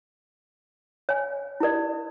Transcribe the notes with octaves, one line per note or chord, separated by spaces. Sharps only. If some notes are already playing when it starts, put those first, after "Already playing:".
C#5 G#5
E4 G4 A#4 D5